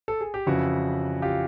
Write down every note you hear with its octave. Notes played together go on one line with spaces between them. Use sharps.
A4
G#4
G4
F2 C#3 E3 E4 F#4
F4 G4